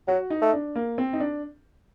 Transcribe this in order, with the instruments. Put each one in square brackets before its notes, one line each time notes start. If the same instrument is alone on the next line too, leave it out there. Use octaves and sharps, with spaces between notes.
[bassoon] F#3 [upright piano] F#4
[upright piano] D#4
[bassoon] A3
[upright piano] D4
A#3
C4
D#4
D4